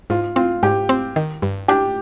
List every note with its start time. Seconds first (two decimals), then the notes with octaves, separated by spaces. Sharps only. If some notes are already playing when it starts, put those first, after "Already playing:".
0.10 G#2 F4
0.36 C4 F4
0.63 G#2 G4
0.89 C4
1.16 D#3
1.42 G2
1.68 D4 G4